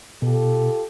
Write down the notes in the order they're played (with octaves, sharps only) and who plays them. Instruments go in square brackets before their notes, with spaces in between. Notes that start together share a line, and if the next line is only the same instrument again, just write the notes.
[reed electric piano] B2 [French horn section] F4 G4 A4